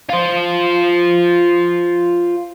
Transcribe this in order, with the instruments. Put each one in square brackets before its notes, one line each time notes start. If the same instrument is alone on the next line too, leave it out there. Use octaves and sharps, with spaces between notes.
[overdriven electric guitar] F4 C5